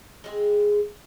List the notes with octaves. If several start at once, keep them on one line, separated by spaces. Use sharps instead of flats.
G#3 C4 F4 G#4